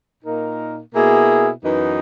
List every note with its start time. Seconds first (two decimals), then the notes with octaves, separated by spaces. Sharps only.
0.21 A#2 A#3 D#4 A#4
0.93 B2 A#3 E4 G#4
1.63 F#2 E3 B3 D#4